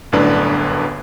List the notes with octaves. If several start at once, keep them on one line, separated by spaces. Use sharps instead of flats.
G1 F#2 A2 D3 D4 B4